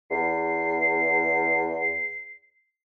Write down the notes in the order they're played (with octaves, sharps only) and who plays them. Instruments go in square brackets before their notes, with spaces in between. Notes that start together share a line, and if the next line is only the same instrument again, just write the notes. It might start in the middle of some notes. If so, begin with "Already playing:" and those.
[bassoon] E2 [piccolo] C7